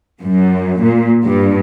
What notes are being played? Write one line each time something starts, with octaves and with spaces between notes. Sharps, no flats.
F#2
A#2
G2